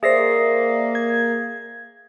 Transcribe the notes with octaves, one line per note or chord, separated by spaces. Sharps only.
A#3 G#4 C5 D5 E5 A#6 C7
G#6